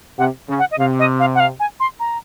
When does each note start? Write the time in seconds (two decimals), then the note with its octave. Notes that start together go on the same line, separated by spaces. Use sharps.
0.18 C3 F#5
0.49 C#3
0.59 F#5
0.71 D#5
0.78 C3 F5
0.99 D#5
1.19 F5
1.35 F#5
1.40 F5
1.60 G#5
1.80 C6
2.00 A#5